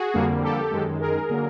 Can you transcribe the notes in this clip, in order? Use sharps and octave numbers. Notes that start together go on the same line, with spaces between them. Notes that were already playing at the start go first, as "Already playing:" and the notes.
Already playing: F#4 G#4
F2 D3 G3 A#3
G4 A4
F#2 D#3 G#3
G#4 A#4
D3 F#3 A#3